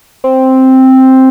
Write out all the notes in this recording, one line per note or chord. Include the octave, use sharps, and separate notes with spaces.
C4